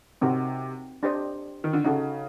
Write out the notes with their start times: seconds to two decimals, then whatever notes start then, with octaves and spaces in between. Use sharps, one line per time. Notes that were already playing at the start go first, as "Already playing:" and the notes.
0.21 C3 C4 D#4 F#4 A#4
1.03 D4 G4 C5 D#5
1.64 D#3
1.73 D3
1.84 C#3 D#4 F#4 A4